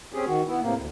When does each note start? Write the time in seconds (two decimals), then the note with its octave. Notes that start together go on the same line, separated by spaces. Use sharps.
0.13 C4 C#4 G4 G#4
0.27 D#3 F#4
0.46 B3 E4
0.61 A2 C3 A#3
0.76 D2